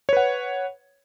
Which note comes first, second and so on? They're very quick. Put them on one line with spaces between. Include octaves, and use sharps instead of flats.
C#5 B4 F#5